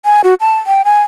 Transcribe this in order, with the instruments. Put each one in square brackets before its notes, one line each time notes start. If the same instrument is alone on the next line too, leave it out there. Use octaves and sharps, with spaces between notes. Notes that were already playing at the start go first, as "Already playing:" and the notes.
[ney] G#5
F#4
A5
G5
G#5